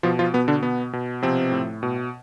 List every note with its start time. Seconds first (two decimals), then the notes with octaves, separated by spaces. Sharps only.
0.03 B2 F3 F4
0.19 F3 F4
0.33 B2 B3
0.48 D3 D4
0.63 B2 B3
0.93 B2
1.22 C3 F3 C4
1.52 A2
1.83 B2